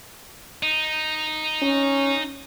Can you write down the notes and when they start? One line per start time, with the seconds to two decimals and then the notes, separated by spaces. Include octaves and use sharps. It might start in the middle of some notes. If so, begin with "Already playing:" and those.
0.63 D#4
1.62 C#4